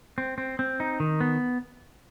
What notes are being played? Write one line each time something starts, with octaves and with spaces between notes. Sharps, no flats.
C4
C4
C4
D#4
D#3
B3